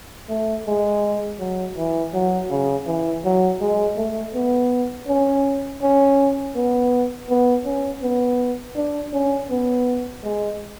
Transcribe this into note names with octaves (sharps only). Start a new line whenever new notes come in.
A3
G#3
F#3
E3
F#3
C#3
E3
F#3
G#3
A3
B3
C#4
C#4
B3
B3
C#4
B3
D4
C#4
B3
G#3